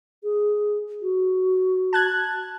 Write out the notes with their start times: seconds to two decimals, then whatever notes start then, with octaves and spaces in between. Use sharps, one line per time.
0.24 G#4
1.02 F#4
1.93 A5 F#6 G#6